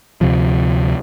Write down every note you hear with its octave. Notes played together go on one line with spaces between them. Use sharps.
D2 C3 F3